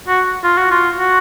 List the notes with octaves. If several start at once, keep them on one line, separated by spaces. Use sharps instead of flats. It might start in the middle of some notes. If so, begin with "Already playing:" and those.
F#4
F4
F#4
F4
F#4